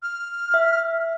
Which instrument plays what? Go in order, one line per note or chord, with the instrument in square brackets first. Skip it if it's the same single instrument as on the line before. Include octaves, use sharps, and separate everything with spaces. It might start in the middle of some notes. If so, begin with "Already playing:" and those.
[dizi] F6
[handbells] E5